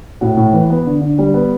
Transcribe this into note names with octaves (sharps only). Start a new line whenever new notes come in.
A2 F#4
A2
E3
B3
D3
D3
G3
B3